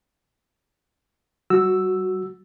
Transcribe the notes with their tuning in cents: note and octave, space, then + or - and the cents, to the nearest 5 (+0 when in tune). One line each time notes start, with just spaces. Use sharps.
G3 -30 F#4 +0 E6 +0